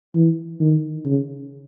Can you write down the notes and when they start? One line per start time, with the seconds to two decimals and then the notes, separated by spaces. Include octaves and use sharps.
0.15 E3
0.60 D#3
1.05 C#3